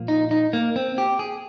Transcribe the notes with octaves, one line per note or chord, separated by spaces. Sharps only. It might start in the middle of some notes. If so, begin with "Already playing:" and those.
Already playing: A#2 F3 A#3
D#4
D#4
A#3
C4
G4
G#4